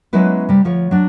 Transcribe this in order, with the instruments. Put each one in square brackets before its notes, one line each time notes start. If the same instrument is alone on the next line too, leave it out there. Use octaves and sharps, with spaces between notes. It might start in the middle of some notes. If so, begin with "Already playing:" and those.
[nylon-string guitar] F#3 G#3 B3 C#4 E4 B4
C3 G3
D2 F3 C#5
F#3 D4